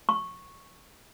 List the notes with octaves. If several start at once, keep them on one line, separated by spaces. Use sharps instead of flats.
C#6